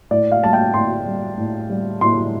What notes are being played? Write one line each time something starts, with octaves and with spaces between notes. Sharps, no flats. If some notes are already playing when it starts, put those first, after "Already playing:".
A2 D5
F5
G3 A5
G5
A2 C6
G3
A2
G3
A2 C6